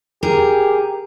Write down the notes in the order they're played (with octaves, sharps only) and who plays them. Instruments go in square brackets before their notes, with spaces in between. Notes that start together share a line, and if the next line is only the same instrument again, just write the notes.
[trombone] G4 [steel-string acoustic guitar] G#4 A#4